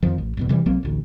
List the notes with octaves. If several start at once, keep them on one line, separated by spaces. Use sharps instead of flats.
F2 D#3 F3
A1
G1 E2 B2
C3 E3 G3
B1 F#3 A#3 C4
A1 D2